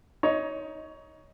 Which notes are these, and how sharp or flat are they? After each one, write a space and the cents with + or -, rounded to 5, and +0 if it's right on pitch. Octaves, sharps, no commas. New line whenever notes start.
D#4 +15 C#5 +15